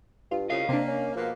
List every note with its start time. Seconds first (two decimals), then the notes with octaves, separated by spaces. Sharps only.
0.31 G2 F4
0.50 C2 C#3 D#5 F5
0.69 C3 A#3 C4 D4
0.88 C#4
1.15 B2 F3 G#3 A#3